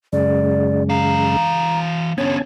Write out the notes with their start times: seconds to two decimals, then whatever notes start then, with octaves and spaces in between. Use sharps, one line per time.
0.13 F#2 C#3 G#3 D5
0.89 E3 F5 A#5
2.18 D3 B3 C#4 C#5 G#5 A5